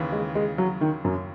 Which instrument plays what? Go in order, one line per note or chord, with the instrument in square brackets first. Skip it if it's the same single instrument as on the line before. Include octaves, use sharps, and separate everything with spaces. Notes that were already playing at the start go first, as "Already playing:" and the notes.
Already playing: [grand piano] D#2 C#3 E3
[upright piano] G#3
G#3
F#3
D#3
F#2